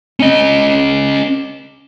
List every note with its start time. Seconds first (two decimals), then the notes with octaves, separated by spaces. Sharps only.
0.20 C#4 D#5